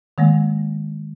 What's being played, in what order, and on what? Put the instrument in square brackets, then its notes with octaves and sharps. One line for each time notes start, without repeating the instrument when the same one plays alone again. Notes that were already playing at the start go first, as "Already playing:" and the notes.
[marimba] D#3 G#3 A#3